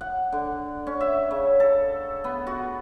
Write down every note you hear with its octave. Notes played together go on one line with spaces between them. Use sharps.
F#5
D3
C#4
E5
C#3
A4
B3
F#4